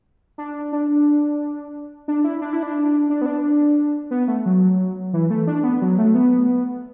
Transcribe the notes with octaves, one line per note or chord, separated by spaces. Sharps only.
D4
D4
D4
E4
D4
E4
D4
D4
B3
D4
B3
A3
F#3
E3
A3
D4
B3
F#3
A3
B3